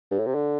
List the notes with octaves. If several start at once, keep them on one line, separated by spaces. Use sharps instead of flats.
G2
A2
C3
D3